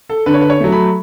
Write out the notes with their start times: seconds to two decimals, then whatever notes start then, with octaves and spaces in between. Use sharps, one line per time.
0.09 A4
0.26 D3 B4
0.34 C#5
0.41 B4
0.50 C#5
0.60 F#3 A3
0.72 B5